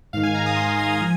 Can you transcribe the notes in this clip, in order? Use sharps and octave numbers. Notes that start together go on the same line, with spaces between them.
G#2 D#3 F5
G#5
A#5
D#6
C6
G#5
G#5
F3